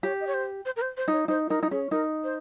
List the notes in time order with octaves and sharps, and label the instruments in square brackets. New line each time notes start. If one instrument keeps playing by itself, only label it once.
[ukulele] G4 [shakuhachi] C#5
[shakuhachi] D#5
C#5
C5
C5
A#4
C5
C5
[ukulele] D#4 [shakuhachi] C#5
[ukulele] D#4 [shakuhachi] C5
[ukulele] D#4 [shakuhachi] A#4
[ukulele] D#4
[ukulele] C#4 [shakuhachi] G#4
[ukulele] D#4 [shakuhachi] A#4
[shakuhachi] C5